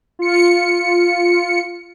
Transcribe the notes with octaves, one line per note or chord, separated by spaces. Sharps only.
F4 C#7